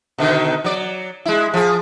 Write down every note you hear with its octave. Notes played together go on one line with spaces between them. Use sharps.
B2 D3 D#3
F#3 D5
G#3 E4
F3 G#4